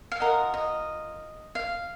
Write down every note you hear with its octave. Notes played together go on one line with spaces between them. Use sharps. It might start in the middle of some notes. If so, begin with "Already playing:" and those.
F5
F4 A#4 D#5 F#5
D#5
F5